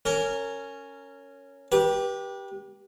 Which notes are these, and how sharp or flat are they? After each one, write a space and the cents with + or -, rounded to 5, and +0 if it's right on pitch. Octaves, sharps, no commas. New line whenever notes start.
C#4 +0 A#4 -25
G4 +0 B4 -35